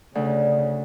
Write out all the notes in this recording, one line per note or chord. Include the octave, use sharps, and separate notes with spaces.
D2 C#3